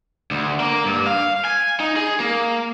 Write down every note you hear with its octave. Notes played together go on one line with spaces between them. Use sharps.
D2
A#3
G2
F5
G#5
D#4
G#4
A#3